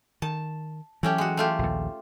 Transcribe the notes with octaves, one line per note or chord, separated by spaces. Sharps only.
D#3 A5
E3 F#3 A3 C#4 G4
G#3 F#4
A3 F4 G4
A#1 D#2